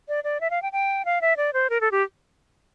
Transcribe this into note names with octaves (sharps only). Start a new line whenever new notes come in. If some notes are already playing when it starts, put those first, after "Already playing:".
D5
D5
E5
F5
G5
G5
F5
E5
D5
C5
A#4
A4
G4